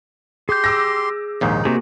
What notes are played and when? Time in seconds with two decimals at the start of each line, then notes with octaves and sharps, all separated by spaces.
0.49 G4 G#4 C6 G6
0.64 D6 E6 A#6
1.41 A#1 D#2 G#2 D#4
1.65 C3 A#3 F#4 G#4